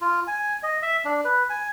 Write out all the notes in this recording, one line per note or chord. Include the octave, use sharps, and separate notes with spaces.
F4
G#5
D#5
E5
D4
B4
G#5